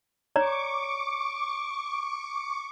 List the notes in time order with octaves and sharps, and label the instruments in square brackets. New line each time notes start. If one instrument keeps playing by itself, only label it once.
[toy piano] C#5 D5 A#5 [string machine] C#6 D6